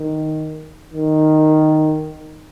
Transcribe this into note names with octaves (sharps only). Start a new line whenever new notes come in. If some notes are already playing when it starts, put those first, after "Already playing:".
Already playing: D#3
D#3